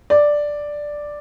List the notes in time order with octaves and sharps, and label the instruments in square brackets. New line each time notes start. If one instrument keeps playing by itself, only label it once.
[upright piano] D5